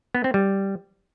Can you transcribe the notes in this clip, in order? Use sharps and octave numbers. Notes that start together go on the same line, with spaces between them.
B3
C4
G3